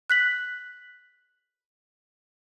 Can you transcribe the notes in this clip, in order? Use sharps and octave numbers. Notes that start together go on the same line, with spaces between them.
F#6 B6 F#7